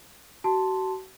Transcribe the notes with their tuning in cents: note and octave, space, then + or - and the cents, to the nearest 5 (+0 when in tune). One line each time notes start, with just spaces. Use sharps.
F#4 +35 A5 +0 C6 +0